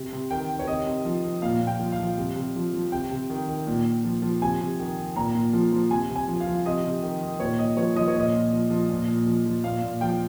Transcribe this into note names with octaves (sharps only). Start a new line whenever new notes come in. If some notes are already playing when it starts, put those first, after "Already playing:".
Already playing: C3
C3
D#3 G5
D#3
C#5
C3 D#5
C3
F3
F3
A#2 F5
A#2
G5
F3
F5
F3
C3
C3
F3
F3
C3 G5
C3
D#3
D#3
A#2
A#2
F3
F3
C3 G#5
C3
D#3
D#3
A#2 A#5
A#2
F3
F3
C3 G#5
C3
G#5
F3
F5
F3
C3 D#5
C3
D#3
D#3
A#2 C#5
A#2 D#5
F3 C#5
F3 D#5
C#5
A#2 D#5
A#2
F3
F3
A#2
A#2
F3
F3
A#2 F5
A#2
F3 G5